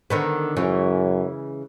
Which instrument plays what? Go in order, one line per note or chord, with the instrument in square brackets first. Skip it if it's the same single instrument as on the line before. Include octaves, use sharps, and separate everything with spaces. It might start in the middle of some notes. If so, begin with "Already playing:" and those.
[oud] D3 D#3 B3
[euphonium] F#2 [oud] C#3 E3 G#3